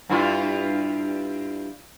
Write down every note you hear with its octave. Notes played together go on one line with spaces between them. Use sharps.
G2 E4 F4